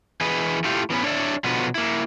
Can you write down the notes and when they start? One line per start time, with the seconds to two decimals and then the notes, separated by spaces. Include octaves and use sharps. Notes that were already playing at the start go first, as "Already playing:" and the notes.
0.21 E3 G#4 B4 D#5
0.64 A3 E4 F4 G4
0.90 E3 B3 C#4 B4
1.03 D4 C#5 D5 E5
1.44 B2 D3 F3 F#3 B3 B4
1.75 A#3 E4